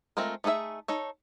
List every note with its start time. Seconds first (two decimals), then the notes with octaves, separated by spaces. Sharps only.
0.17 G#3 A3 C4 F4 A#4
0.44 A3 D#4 G#4 A4 E5
0.88 D#4 A4 C#5